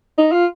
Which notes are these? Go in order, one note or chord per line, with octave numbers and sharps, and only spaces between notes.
D#4
F4